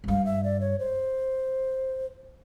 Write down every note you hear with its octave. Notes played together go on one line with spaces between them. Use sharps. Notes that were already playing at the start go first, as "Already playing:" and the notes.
G#2
G2 F5
E5
D5
C#5
C5